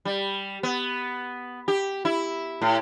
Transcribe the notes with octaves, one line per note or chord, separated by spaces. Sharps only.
G3
B3
G4
E4
A2